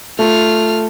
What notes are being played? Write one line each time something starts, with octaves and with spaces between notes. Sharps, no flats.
A3 F4 F6